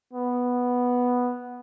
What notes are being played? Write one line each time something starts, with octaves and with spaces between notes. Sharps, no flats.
B3